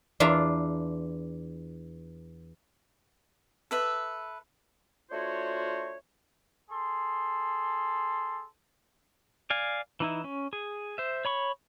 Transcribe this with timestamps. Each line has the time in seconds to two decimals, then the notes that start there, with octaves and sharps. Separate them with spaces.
0.20 E2 D4 F4 E5 A#5
3.71 A4 B4 E5
5.10 A3 D4 F4 F#4 C5 C#5
6.70 G#4 A4 C6
9.50 D5 F5 G#5
10.00 E3 D#4 E4
10.24 C#4
10.53 G#4
10.98 C5 E5
11.25 C#5 B5 C#6